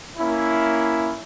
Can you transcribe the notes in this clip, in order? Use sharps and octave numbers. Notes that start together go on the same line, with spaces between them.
A#3 C#4 E4